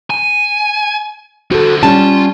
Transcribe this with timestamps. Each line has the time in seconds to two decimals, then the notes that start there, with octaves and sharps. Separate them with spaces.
0.10 G#5
1.51 D3 F#4 A4 C5
1.83 G3 C#4 F4 A5